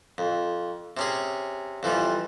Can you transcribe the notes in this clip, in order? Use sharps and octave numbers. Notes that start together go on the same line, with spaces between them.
F2
C3 C#4 G#4
F2 E3 F3 G3